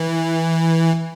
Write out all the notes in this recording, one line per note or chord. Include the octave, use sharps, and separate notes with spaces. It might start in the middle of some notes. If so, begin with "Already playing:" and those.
Already playing: E3